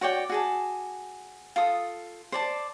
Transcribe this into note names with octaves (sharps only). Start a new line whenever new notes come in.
F#4 C#5 D5 G5
F#4 G#4 A5
F4 A4 D#6
C5 D5 A5